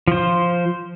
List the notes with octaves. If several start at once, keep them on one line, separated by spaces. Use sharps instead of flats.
F3 C5